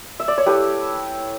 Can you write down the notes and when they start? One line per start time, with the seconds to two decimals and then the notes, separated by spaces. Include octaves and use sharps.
0.20 E5
0.28 D5
0.38 C#5
0.46 A3 E4 G4 B4